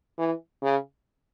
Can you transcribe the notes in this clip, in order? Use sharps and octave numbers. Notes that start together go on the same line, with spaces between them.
E3
C#3